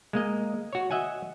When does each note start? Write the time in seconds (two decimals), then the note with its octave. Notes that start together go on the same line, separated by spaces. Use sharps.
0.13 G#3 A#3 D#5
0.73 F#4 C#5
0.91 D#5 E5 F#5 G#5